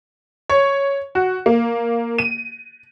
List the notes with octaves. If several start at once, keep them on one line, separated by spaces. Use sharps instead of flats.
C#5
F#4
A#3
D#7